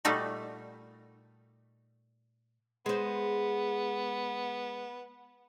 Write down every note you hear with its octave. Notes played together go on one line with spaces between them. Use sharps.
A#2 G3 A3 D#4 F#4
G#3 B3 C5